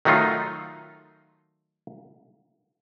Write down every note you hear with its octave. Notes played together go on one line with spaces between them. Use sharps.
D#3 F#3 A3 D#4 F4